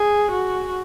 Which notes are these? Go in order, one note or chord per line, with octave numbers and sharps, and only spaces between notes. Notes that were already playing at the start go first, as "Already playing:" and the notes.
Already playing: G#4
F#4